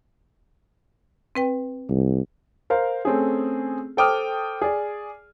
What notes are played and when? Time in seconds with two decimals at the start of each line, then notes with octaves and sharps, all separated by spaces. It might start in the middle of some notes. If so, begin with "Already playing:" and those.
1.35 C4 B4 G5
1.90 C2
2.70 A#4 C5 F5
3.05 A3 C4 C#4 G#4
3.97 A4 C5 G5 D6 D#6 F6
4.62 G#4 D5